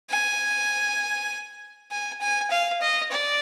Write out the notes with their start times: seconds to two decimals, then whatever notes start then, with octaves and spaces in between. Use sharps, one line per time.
0.10 G#5
1.91 G#5
2.21 G#5
2.51 F5
2.81 D#5
3.11 D5